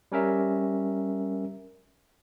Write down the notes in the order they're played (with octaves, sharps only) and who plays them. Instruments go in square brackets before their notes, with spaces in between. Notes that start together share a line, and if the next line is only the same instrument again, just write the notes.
[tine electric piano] G3 C#4 A#4 E5